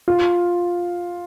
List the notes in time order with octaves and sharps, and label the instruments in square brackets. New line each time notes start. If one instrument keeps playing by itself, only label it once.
[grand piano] F4